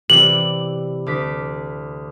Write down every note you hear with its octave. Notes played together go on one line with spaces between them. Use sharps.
C3 E3 D5 F#7
D2 D6 B6